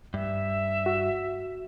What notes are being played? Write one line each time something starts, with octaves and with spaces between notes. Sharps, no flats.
G2 E5
F#4